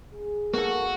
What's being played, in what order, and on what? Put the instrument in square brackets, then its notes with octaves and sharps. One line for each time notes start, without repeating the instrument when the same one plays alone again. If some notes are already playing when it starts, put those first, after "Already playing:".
[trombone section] G#4
[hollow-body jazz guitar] A#3 A4 [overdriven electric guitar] F#4